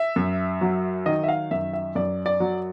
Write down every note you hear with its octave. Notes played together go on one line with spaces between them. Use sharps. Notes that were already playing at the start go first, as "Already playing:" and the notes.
Already playing: E5
F#2
F#3
D#3 D#5
E5
F5
F#2 E5
E5
F#2 D5
D5
F#3